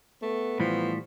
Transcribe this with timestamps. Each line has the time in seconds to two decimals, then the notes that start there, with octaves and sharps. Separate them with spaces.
0.22 A3 B3
0.60 A2 E3 F3 G3